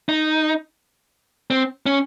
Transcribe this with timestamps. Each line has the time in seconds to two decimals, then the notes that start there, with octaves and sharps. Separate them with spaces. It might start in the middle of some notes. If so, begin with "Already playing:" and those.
0.09 D#4
1.50 C4
1.86 C#4